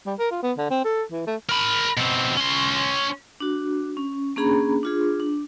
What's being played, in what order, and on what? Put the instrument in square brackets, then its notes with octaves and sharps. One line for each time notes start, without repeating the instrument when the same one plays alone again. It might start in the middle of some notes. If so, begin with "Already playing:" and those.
[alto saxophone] G3
A#4
F4
B3
D3
C4
A4
E3
A3
[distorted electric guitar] A#4 B5
B2 C4
C#4 C6
[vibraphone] D4 F#4
C#4
A#3 C#4 D4 G#4 A#5 B5
D4 F4 G#4
D4